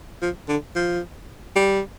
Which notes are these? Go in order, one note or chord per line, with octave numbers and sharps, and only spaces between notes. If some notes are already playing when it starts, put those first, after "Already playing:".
F3
D3
F3
G3